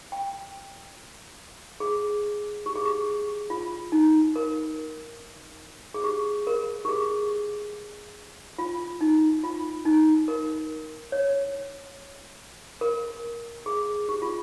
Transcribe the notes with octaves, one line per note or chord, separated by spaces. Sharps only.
G5
G#4
G4
G#4
G4
F4
D#4
A#4
G#4
G4
A#4
G4
G#4
F4
D#4
F4
D#4
A#4
C#5
A#4
G#4
G4
F4